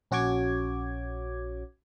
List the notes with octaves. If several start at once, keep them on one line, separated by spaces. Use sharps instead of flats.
A#1 C#4 F#4 C#5 D6 G#6